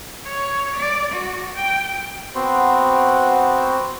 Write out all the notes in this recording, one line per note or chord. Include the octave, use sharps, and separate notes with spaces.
C#5
D5
F#4
G5
B3 C4 F#4 C5